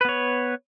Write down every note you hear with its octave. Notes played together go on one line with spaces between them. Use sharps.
B3 B4 C#5